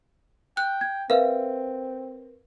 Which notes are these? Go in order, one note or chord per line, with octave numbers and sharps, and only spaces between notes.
G5 F#6
G#6
C4 A#4 B4 E5 F5